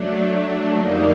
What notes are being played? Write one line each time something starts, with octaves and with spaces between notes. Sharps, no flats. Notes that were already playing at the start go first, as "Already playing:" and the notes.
Already playing: F#3 A3 D4
F2 D3 G3 A#3 D#4